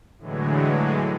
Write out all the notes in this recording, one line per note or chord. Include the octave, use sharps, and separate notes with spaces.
A2 D3 E3 F#3 G#3